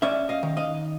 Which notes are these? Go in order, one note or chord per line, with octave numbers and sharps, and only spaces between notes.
C#4 D5 E5
D#5 F5
D#3
D#5 F5